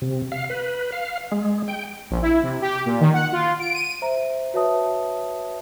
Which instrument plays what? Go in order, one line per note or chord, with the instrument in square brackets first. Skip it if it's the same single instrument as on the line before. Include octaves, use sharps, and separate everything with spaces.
[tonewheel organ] C3
F5
B4
F5
G#3
G5
[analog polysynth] A#1
E4
C3
G4
A#2
D#3
F#5
F4
D7
D#7
[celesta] C5 E5 A#5
F#4 B4 C#5 E5 A5 D#6